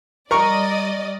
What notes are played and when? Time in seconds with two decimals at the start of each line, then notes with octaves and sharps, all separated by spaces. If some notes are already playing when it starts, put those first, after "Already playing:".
0.31 G3 A#4 D5 D#5 C#6